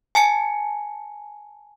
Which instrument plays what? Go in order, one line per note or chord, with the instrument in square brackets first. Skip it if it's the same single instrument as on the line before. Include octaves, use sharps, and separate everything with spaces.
[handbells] G#5 A5 C#7